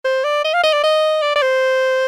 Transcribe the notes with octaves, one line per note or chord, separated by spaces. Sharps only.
C5
D5
D#5
F5
D#5
D5
D#5
D5
D5
C5